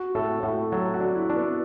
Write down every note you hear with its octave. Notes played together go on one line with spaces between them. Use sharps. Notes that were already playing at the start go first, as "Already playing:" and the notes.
Already playing: F#4
A2 A4
A2 F#4
F#3 A4
F#4
D4
E4
D4
B3